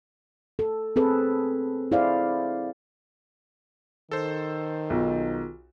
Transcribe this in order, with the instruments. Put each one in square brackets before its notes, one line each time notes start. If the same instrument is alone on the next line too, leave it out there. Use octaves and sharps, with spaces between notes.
[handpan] A4
C4 G#4 A4 B4
E4 G#4 C5 D5 F5
[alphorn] D#3 [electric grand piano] A4 C5
[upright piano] B1 [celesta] F4 G#4